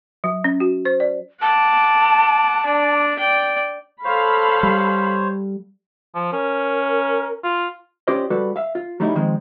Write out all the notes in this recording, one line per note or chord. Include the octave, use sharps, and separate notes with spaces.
F#3
C#4
F#4
C5
D5
F#5 A5 D6
D4 D5
D5 G5
A4 C5 C#5 F5 B5
G3
F3
C#4 A#4
F4
C#4 F4 G4 C5 D5 D#5
G3 F#4 A4 B4
E5 F5
F4
F#3 G3 A3 D#4 E4
D#3 F3 G#3 C4